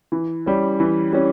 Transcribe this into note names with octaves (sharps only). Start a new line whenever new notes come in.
E3
G3 C#4
E3
G3 C#4